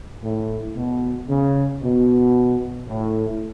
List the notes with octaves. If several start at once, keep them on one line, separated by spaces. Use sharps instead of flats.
A2
B2
C#3
B2
A2